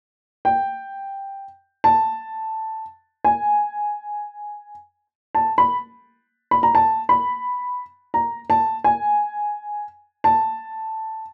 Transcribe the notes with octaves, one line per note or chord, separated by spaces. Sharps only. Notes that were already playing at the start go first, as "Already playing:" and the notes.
G5
A5
G#5
A5
B5
B5
A#5
A5
B5
A#5
A5
G#5
A5